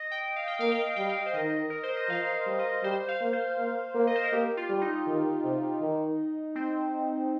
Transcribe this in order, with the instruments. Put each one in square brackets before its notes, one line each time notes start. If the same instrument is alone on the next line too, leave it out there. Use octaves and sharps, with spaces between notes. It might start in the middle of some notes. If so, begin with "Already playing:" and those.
Already playing: [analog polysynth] D#5
G5
F5
G5
[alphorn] A#3 [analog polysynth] F5
[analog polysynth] G5
F5
[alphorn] G3 [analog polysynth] G5
[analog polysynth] F5
C5
[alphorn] D#3 [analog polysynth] D#5
[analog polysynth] A#4
C5
D#5
[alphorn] F3 [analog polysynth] F5
[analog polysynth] F5
[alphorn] G3
[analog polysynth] D#5
[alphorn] G3 [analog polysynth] C5
[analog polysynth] F5
[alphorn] A#3
[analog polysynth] C5
[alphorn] A#3
A#3
[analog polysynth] D#5
C5
A#4
[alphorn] A#3 [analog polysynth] G4
[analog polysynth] F4
[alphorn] G3
[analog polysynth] D#4
[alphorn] D#3
C3
D#3
[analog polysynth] C4